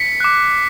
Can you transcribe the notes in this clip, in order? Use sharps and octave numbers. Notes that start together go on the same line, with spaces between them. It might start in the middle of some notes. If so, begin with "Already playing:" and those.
Already playing: B6 C#7
D6 F#6